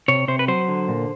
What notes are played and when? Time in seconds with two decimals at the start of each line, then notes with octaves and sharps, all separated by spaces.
0.08 C3 C#5
0.28 C3 C5
0.39 B4
0.48 F#3 C5
0.69 D3
0.88 A#2